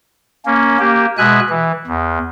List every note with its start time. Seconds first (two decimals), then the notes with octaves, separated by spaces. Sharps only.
0.46 A#3 C#4
0.79 A#3 G4
1.18 B2 G#3 E5 G#5 F#6
1.50 E3
1.87 E2